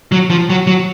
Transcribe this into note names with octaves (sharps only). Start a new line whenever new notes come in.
F#3
F3
F#3
F#3